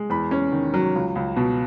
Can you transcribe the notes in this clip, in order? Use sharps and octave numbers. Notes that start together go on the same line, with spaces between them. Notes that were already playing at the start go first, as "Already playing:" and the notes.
Already playing: G#3
E2 B5
C#4
D#3
F#3
C#2
C#2
B2